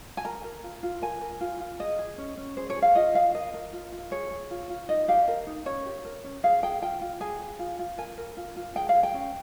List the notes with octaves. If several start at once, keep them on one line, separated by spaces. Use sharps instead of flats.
G#5
A#4 A#5
A#4
F4
F4
A#4 G#5
A#4
F4
F4
G#4 D#5
G#4
C#4
C#4
G#4 C5
C#5
G#4
F5
F4 D#5
F4 F5
A#4 D#5
A#4
F4
F4
G#4 C#5
G#4
F4
F4
D#4 D#5
G4 F5
A#4
D#4
C#4 C#5
G4
A#4
C#4
G#4 F5
G#4 G5
F4 G5
F4
G#4 G#5
G#4
F4
F4
A#4 G#5
A#4
F4
F4
G#4 G5
F5
G#4
G5
C#4